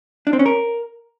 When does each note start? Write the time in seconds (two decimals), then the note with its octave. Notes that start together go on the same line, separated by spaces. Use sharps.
0.27 D4
0.33 C4
0.39 C#4
0.46 A#4